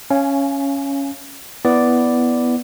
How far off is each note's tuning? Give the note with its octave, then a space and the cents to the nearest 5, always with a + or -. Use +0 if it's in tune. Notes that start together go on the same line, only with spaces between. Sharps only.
C#4 +0 F5 -25 G#5 +25
B3 +0 E4 +5 D5 +0